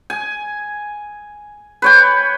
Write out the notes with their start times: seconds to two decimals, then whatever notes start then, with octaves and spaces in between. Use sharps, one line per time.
0.10 G#5
1.82 B4 C#5 G5